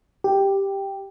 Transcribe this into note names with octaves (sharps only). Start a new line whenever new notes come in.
G4